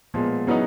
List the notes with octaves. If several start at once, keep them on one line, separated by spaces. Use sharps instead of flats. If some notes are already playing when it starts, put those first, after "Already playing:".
A#2 F3 G#3 B3
C#3 F#3 B3 D#4 E4